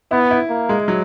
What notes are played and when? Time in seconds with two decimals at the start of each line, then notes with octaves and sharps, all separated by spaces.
0.11 B3 E4
0.31 E4
0.50 A#3
0.69 G#3
0.88 F#3